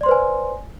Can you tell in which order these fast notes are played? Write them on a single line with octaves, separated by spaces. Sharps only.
D5 C6 C5 B4 G#5